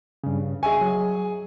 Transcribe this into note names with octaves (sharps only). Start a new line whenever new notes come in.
G2 C#3
G#4 D#5 E5 G#5 C#6
F#3